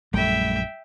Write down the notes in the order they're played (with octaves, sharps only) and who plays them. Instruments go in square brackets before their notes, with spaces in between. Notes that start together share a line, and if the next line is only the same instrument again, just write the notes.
[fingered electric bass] A#1 F#2 [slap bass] G3 A3 [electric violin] E5 G5